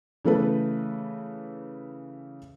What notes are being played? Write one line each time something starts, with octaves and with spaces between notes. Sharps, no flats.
C#3 E3 A3 A4 B4